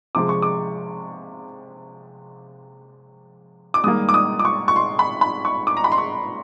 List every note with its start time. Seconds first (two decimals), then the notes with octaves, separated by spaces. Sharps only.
0.15 C3 F3 G#3 D6
0.29 C#6
0.42 D6
3.74 D6
3.84 G#2 D#3 G3 A#3 D#6
4.09 D6
4.14 D#6
4.39 D6
4.45 C#6
4.68 C#6
4.76 C6
4.99 B5
5.21 B5
5.45 C#6
5.67 D6
5.77 A#5
5.84 B5
5.92 C6
5.98 C#6